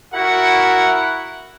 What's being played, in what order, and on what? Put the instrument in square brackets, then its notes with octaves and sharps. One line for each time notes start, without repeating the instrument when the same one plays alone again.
[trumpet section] E4 F#4 A#4 F#5